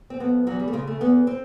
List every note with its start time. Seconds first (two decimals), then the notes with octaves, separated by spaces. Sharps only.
0.10 C4
0.20 F2 B3
0.47 E2 F#3
0.60 G3
0.68 A3
0.73 C#3 G#3
0.87 A3
1.01 E2 B3
1.27 C4